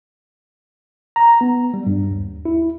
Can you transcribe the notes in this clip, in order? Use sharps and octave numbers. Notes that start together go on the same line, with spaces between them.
A#5
B3
G3
G2
D#2
E4